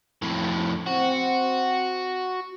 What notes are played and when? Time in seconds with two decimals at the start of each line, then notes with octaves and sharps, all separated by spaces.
0.22 F2 A2
0.87 C4 F#4